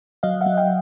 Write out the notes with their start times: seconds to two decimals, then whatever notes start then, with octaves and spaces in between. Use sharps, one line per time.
0.23 F#3 D#5 F5
0.41 E5 F#5
0.46 F#3
0.57 F5 G5